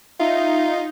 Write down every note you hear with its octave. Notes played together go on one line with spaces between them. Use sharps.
D#4 F4 E5